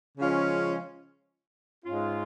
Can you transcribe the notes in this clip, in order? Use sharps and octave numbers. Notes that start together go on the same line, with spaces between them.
C#3 F3 G#3 C#4 F4
G#2 G#3 C#4 F4